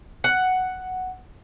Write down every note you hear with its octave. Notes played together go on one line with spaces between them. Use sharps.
F#5